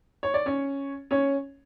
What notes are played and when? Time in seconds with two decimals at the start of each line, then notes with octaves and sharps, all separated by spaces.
0.23 C#5
0.34 D5
0.46 C#4 C#5
1.11 C#4 C#5